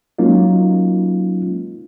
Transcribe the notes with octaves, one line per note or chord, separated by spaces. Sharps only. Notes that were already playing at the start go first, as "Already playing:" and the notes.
F#3 G#3 A#3 C#4 D#4 F4